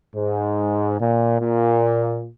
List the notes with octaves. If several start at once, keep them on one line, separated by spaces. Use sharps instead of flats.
G#2
A#2
A#2